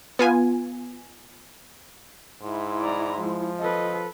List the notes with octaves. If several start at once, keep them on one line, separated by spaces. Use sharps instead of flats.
B3 F4 G#5
G#2 E4 C6
D5 A#5
F3 G#3
A4 B4 D#5